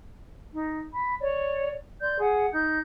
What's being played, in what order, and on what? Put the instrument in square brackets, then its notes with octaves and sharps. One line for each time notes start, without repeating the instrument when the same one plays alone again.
[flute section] D#4
B5
C#5 D5
D5 C6 G6
G#4 F#5
D#4 G6